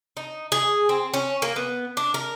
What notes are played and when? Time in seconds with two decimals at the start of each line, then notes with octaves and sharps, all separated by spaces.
0.17 D#4
0.52 G#4
0.89 C4
1.14 C#4
1.42 A#3
1.56 B3
1.97 D4
2.14 A#4